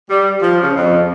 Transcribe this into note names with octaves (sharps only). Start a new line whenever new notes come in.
G3
F3
C#3
F2